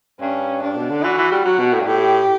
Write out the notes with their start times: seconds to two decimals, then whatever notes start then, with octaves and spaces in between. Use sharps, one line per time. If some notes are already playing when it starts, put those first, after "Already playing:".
0.21 G2 C#4
0.62 G2 D4
0.76 B2
0.90 D3
1.03 E3 F#4
1.18 E3
1.32 G3
1.45 F#3 F#4
1.59 B2
1.73 A2
1.80 G2
1.86 A2 G4